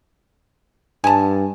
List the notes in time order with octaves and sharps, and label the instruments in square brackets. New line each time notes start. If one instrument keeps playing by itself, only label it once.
[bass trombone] G2 [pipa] G#5 A5